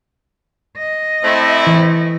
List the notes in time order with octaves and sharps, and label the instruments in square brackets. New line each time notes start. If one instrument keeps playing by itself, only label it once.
[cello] D#5
[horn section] A3 C4 E4
[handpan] E3